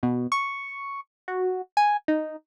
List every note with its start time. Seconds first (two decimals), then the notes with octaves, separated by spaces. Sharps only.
0.03 B2
0.32 C#6
1.28 F#4
1.77 G#5
2.08 D#4